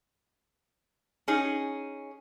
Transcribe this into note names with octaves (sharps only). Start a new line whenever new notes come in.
C#4 D#4 G#4